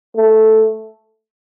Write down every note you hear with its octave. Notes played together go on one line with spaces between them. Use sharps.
A3